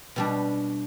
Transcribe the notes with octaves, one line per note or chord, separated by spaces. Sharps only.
B2 G3 D4